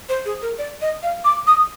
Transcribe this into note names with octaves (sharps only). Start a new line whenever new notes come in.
C5
G#4
A#4
D5
D#5
F5
D6
D#6